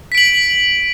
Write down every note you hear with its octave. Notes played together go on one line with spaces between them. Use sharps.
B6 D7 F#7